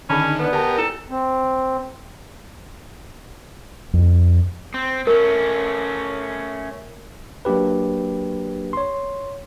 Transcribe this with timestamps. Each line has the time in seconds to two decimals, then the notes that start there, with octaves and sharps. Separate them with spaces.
0.10 D3 D#3 C#4 G#4 A5 B5
0.40 B3 B4 D5
0.53 G4 A#4 G#5 A5
0.78 E4 A4
1.10 C4
3.93 F2
4.74 C4
5.07 A3 C#4 A#4
7.45 F#3 A#3 D4 G4 B4
8.73 C#5 C6